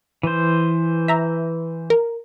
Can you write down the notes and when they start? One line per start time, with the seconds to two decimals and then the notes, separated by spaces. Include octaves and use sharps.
0.23 E3 C5
1.08 E5 A#5
1.90 A#4